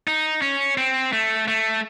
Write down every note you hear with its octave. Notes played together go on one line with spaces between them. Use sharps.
D#4
C#4
C4
A3
A3